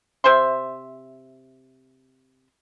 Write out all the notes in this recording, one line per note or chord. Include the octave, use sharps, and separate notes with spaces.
C3 C5 E5 C6